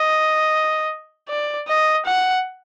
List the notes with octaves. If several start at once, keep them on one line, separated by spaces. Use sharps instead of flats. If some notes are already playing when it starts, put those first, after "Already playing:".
Already playing: D#5
D5
D#5
F#5